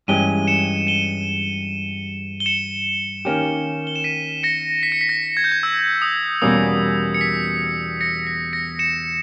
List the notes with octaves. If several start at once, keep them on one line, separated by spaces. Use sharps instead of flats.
G2 E3 G#3 C#4 G4 D#7 G7
C#7 E7
D#7 G7
G7
C#7 E7
D#3 A#3 C#4 G4
G7
E7
B6 D#7
A#6 C#7
B6
C#7
B6
A#6
G#6
G6
G#6
E6
D#6
E2 B2 G3 A#3 C#4 D#6
C#7
B6
A#6 C#7
C#7
B6
A#6 C#7
C#7 E7